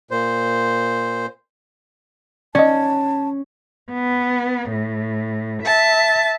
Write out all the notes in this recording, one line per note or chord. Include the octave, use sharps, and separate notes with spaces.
A#2 C5
C#4 D5 D#5 A5
B3
A2
E5 A5